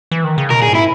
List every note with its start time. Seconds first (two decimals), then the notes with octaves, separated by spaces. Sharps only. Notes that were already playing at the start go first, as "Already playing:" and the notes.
0.11 E3
0.24 D#3
0.38 C#3
0.50 B2 A#4
0.60 A#2 G#4
0.68 G#2
0.75 E4